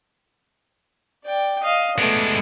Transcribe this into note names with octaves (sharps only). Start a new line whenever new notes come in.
D5 G5
D#5 F5
G#3 A3 B3 D4